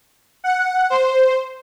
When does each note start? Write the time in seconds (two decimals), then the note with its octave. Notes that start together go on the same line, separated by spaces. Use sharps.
0.44 F#5
0.90 C5